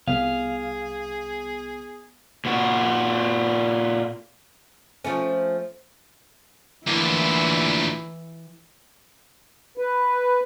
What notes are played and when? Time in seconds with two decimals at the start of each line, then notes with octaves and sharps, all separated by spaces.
0.08 C2 B3 G#4 F5
2.45 A#2 F#4
5.04 F3 A3 C#4
6.87 D2 A#2 E3 E4
9.78 B4